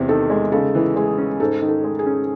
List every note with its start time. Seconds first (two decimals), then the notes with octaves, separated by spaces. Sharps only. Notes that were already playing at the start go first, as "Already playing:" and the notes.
Already playing: E2 C3
0.08 D#3 A4
0.30 G#3
0.52 C#3 A4
0.75 E3
0.96 G#3 G#4
1.18 C#4
1.40 G#2 A4
1.62 D#3
1.69 A4
1.84 G#3
1.99 G#4
2.06 C#4